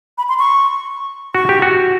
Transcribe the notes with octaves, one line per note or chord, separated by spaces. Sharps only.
B5
C6
C#6
F#4 C#6
G4
F#4